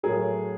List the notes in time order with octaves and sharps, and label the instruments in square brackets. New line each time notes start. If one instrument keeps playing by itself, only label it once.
[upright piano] A2 F#3 A3 G#4 A#4